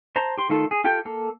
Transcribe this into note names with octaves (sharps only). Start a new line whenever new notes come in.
C5 A5 A#5
G4 C6
D#3 A3 F4 A4
G#4
F4 G4 A4 G5
A#3 A4